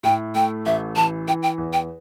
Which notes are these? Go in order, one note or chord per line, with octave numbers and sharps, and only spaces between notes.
A2 G5
A3 G5
A1 E5
E3 A5
E3 G5
G5
E2
G5